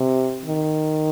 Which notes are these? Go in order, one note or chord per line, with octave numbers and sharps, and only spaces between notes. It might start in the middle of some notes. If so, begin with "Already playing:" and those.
Already playing: C3
D#3